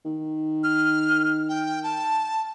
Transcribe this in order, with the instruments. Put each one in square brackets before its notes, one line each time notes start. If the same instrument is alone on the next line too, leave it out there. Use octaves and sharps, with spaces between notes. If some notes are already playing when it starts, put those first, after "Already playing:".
[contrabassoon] D#3
[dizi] F6
G5
A5